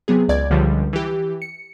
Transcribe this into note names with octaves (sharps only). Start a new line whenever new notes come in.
C3 F#3 B3 G#4
C#2 D5 G#6
C#2 D3 F3 G3
E3 G4
C#7